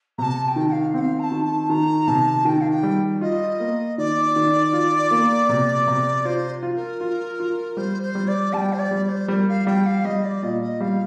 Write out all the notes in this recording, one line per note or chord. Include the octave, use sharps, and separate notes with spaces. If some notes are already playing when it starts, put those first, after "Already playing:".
C3 A5 A#5
A5
G5
D#3
G5
F5
C4 F5 G5
A#5
A5
D#3
A5
D#3 A#5
C3 A5
D#3 G5
F5
G5
G3
F4 D#5
A#3
D#3 D5
D#3
F4
A#3
C3
C3
F4 C5
F4
A#4
F4
F4
G3 C5
C5
G3
D5
G3 G5 A5
C5
D5
G3
D5
C5
G3 A#4
F5
G3 G5
F5
G3 D#5
D5
A#2 D#5
D#5
G3 F5